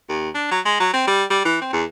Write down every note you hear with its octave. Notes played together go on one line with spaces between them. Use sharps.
D#2
D4
F#3
G#3
F#3
C4
G3
G3
E3
C4
E2